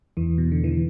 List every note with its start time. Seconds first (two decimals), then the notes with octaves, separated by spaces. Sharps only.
0.17 E2 E3
0.38 B2
0.52 D3
0.64 E3